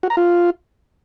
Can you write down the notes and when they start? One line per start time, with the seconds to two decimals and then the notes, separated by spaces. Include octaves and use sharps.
0.03 F#4
0.10 A#5
0.17 F4